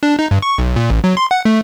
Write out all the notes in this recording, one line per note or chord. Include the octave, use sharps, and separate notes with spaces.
D4
D#4
G2
C#6
B1
A#2
A1
F#3
C6
F#5
A3